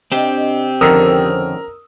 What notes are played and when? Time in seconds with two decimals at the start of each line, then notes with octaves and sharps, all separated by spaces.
0.12 C4 D4 G4 D#5
0.81 F2 D3 D#3 C#4 A#4 C5 D#6 E6